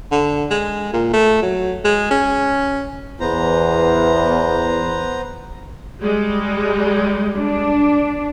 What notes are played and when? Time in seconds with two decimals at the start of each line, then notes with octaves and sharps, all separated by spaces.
0.12 D3
0.51 G#3
0.93 A#2
1.13 A3
1.42 F#3
1.85 G#3
2.11 C#4
3.20 E2 B3 C5 A#5
6.00 G3 G#3
7.36 D4